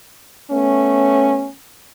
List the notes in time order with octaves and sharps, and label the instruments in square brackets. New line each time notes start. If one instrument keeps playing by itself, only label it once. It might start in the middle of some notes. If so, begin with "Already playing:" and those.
[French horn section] A3 B3 C#4